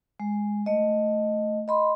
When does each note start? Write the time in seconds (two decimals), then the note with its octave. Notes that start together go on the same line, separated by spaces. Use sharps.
0.20 G#3
0.66 A3 D#5
1.68 D#5 B5 C6